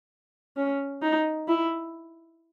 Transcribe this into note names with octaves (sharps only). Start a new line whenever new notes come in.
C#4
D#4
E4